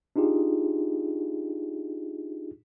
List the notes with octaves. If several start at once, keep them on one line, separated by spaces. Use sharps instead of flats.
D4 D#4 F4 G4 G#4